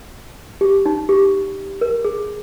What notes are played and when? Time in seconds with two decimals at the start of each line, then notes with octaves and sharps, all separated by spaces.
0.61 G4
0.86 D#4
1.09 G4
1.81 A#4
2.05 G#4